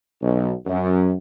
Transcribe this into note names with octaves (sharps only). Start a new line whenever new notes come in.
B1
F#2